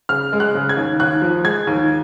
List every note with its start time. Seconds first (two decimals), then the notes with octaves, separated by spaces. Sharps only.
0.09 C#3 F6
0.33 G#3
0.40 F#6
0.55 C#3
0.69 G#6
0.77 D#2
1.00 D#2 F#6
1.22 F3
1.44 G#3 G#6
1.67 D#2